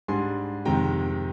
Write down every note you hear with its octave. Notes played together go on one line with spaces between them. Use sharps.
G#2 G3 D4 G#5 C6
F2 C3 D#3 G#3 G5 A#5